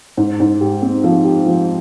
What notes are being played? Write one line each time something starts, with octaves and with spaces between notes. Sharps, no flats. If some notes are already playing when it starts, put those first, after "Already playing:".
G#2
G#2
G4
C4
F3
G4
F3